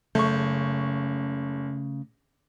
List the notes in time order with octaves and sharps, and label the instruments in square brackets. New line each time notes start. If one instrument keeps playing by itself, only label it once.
[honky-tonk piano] F#1 C#6 [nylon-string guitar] C#3 [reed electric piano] A3 G6